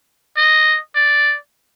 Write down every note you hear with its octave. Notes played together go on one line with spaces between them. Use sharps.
D#5
D5